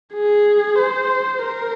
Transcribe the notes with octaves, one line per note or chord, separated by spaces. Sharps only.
G#4
C5
A#4